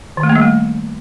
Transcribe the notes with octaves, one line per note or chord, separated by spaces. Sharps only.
D#3
A3
A#3
G3
A3